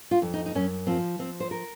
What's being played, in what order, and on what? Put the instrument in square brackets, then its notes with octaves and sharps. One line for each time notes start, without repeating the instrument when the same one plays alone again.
[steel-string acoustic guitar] F4
F2
D#4
D#4
F#2 C#4
F3 C4
F3 C4
C5
A#4